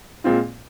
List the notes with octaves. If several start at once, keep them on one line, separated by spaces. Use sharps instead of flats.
A#2 G#3 C4 F4